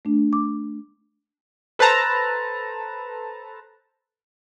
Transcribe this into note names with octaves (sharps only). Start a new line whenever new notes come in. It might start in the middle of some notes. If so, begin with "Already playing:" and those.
A3 D4
D6
A4 B4 C5 A5 A#5